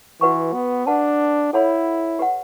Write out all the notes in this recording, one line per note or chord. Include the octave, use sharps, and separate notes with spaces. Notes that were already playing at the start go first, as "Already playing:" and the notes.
E3 F#4 B4 F#5 C#6
B3
D4 B4 F#5 A5
E4 A4 C#5 F#5 B5
G4 B4 F#5